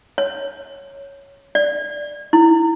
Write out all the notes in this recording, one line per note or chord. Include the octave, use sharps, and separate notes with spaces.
C#5
D5
E4